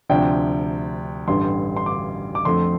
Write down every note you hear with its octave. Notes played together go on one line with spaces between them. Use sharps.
D2 C3 F3 D4 G5
A1 G2 D3 G3 C6
C6
D6
D6
F2 D3 F3 A3 C4 C6